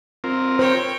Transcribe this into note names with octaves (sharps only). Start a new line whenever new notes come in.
C4 F4 A#4
C5 C#5 G5